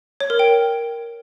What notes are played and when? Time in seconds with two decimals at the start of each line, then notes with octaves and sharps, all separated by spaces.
0.20 C#5
0.30 A#4
0.39 G5